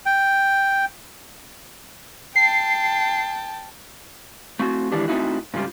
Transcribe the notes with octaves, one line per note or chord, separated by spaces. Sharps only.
G5
G5 A5 C7
A3 C4 F#4
D#3 E3 G#3 D4 G4
A3 C4 C#4 D#4 E4 F#4
G#2 C#3 G3 F4 G4